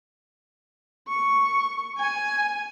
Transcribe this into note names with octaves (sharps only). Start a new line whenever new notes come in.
C#6
G#5